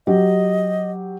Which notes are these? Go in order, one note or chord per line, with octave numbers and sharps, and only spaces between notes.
F#3 G4 D#5